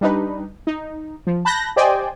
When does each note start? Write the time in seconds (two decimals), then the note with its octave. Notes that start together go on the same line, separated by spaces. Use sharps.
0.01 G3 D4 D#4 B4
0.67 D#4
1.27 F3
1.45 A5 B5 F#6 G6 A#6
1.76 G4 C5 D5 D#5 G5 G#5